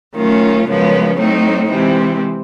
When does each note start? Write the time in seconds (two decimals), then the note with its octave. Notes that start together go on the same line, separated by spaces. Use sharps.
0.15 D#3 F#3 A3 C#4 F4
0.66 F#2 C#3 F3 G#3 B3
1.17 A2 F#3 A3 C4 D#4
1.68 C3 E3 G#3 C4